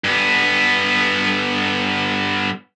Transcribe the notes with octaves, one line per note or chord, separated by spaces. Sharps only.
G2 B3